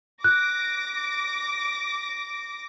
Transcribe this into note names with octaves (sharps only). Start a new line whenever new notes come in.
D6 F#6 A#6